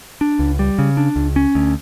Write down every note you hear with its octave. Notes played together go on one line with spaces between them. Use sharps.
D4
C#2
G3
C#3
D4
C#2
C#4
D2